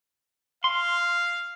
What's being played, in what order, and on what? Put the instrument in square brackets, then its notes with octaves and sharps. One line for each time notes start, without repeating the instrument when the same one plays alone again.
[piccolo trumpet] F5 [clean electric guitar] C6